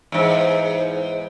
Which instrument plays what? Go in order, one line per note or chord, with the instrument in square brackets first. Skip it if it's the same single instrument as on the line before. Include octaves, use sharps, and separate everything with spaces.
[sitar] E2 G#2